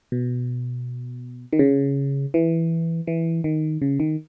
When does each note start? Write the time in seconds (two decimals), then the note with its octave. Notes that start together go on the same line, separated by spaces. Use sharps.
0.12 B2
1.53 D#3
1.59 C#3
2.34 E3
3.07 E3
3.44 D#3
3.82 C#3
4.00 D#3